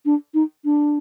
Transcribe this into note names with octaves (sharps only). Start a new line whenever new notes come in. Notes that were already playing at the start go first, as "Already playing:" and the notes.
D4
D#4
D4